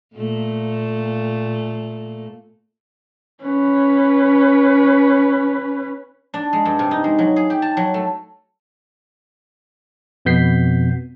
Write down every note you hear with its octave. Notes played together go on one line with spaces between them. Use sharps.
A#2 A3 A#3
C#4 B4
D4
G#3
G2
C3
D#4
G#3
F#3
G#4
G4
A5
F#3
A3
F2 B2 B3 G6 B6 C7